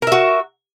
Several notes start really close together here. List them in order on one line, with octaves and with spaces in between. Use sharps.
A#4 E5 F#4